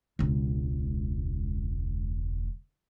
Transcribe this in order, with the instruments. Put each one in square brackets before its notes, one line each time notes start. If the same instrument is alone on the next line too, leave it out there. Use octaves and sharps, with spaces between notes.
[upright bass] E1 C#2